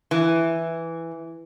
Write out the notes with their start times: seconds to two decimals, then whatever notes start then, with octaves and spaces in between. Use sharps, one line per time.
0.11 E3